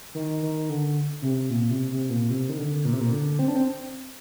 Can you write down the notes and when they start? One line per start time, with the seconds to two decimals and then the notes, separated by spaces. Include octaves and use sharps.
0.14 D#3
0.42 D#3
0.69 D3
1.22 C3
1.50 A#2
1.70 C3
1.91 C3
2.10 A#2
2.30 C3
2.49 D#3
2.58 D3
2.85 A#2
2.93 C3
3.00 A#2
3.12 D3
3.39 C4
3.48 D4
3.56 C4